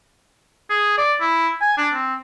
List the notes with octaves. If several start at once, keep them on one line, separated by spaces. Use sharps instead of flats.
G#4
D5
E4
G#5
D4
C4